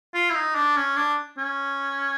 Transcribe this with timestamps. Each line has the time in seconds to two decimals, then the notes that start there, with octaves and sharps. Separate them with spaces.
0.14 F4
0.30 E4
0.35 D#4
0.55 D4
0.76 C#4
0.96 D4
1.38 C#4